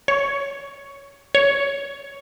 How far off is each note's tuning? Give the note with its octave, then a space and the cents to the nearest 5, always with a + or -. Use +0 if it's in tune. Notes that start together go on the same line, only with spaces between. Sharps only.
C#5 +20
C#5 +20